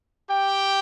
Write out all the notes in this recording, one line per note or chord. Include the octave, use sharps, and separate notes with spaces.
G4 G5